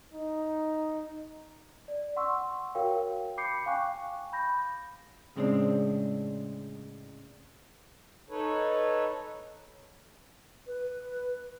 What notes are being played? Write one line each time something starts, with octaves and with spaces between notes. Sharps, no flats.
D#4
D5
F#5 C6 C#6 E6
F#4 A#4 C#5 F5 G5
B5 D6 G6 C7 C#7
F5 G5 G#5 C#6 D6 F#6
B5 G6 A#6
A2 C#3 G#3 C4 D4
D#4 A4 B4 C#5
B4